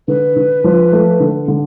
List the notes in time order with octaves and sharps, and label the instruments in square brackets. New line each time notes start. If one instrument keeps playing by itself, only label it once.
[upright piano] D3 [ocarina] B4
[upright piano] D3
F3
A3
D3
D3